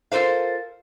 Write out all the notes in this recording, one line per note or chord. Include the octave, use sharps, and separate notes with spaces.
F4 A4 A#4 C5 F5